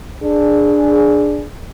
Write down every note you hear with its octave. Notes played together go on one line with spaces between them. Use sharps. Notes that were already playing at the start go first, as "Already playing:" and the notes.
D4 G#4